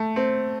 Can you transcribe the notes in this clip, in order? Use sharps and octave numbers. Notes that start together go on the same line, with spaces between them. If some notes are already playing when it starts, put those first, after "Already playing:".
Already playing: A3
C4